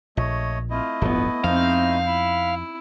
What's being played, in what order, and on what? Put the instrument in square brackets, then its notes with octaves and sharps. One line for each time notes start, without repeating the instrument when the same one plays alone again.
[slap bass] A#1 [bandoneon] A3 C#5 D#5
[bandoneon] A3 E4 D#5 [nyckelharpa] C4 F4
[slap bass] D1 G1 F3 [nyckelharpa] B3
[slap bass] F2 [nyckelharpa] C4 D#4 [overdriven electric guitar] F5
[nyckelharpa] E4 [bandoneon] B5